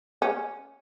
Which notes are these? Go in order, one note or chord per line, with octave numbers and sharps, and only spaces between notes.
C#4